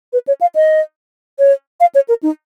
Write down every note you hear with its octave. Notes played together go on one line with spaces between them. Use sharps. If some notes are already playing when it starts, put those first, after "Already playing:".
B4
C#5
F5
D#5
C#5
F5
C#5
A#4
D#4